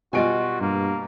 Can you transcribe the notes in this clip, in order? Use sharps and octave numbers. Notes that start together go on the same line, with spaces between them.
B2 G3 F4 F#4 D#5 G#5 D7
G2 A#3